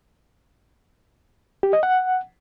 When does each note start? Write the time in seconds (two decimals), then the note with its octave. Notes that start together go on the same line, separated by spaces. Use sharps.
1.63 G4
1.73 D#5
1.83 F#5